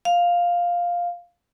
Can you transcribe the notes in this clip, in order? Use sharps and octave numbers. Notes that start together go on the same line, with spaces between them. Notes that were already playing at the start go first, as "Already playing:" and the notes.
F5